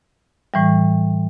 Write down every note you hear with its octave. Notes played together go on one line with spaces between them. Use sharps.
A2 E3 G3